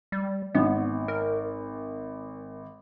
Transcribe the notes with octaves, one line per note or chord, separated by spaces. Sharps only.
G3
G#1 B3
A#4